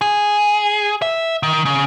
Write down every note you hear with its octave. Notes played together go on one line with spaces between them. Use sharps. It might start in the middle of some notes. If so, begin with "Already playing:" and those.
G#4
E5
D#3
C#3